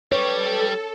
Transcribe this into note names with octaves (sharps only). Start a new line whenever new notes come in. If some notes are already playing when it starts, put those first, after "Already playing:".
G3 G4 A4 B4 C#5